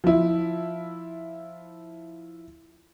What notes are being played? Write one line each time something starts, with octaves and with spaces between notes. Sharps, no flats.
F3 E4